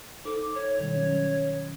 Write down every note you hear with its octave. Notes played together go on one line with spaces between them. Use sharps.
D#4 A4 C5 D6
C#5
B2 D#3 G3
F#3 C#4